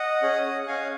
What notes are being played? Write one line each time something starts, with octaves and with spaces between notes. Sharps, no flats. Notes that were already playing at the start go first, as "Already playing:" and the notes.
Already playing: D#5 F#5
C#4 G#4
F#5
C#4 G#4 F5 G#5